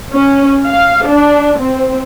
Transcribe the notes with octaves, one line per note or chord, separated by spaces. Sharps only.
C#4
F5
D4
C4